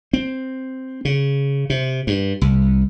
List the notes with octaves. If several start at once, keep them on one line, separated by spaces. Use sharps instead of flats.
C4
C#3
C3
G2
C2